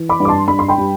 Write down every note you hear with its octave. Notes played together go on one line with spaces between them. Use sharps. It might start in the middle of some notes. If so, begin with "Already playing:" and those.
Already playing: E3
B5 D6
G2
D6
A5 C6
G2 B5
C6
G5 B5
G3